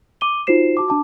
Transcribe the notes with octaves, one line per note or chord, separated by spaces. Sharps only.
D6 D#7 G7
D#4 F4 F#4 C5 C7 E7
F#4 A5 D6
D4 A5 D6